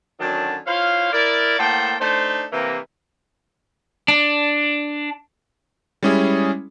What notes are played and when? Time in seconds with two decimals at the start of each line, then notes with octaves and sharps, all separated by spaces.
0.20 F#2 D3 D#3 F#3 D4 A5
0.67 E4 F4 C5 C#5 F5
1.13 E4 A#4 D5
1.59 A2 A#3 C5 F#5 G5 A5
2.00 A3 D4 D#4 C5
2.52 C3 E3 A#3
4.08 D4
6.03 G3 G#3 C#4 E4 G#4